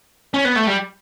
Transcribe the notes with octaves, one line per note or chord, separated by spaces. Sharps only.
C#4
B3
A3
G3